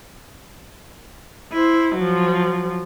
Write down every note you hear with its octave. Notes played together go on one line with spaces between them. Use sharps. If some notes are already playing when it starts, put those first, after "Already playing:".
E4 C5
F3 F#3